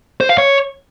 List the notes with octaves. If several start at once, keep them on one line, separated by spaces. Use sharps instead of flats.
C5
F5
C#5